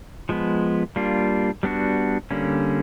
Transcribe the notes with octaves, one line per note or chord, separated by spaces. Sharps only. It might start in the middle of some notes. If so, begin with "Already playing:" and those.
F3 G#3 B3
G3 A#3 D4 F4
G3 B3 D4 F#4
D3 G3 A#3 C#4